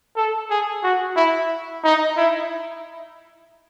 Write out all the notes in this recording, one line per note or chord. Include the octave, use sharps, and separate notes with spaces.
A4
G#4
F#4
E4
D#4
E4